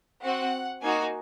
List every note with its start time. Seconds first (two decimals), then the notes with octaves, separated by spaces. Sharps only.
0.22 C4 F#4 F#5
0.81 A#3 D#4 F#4 G#5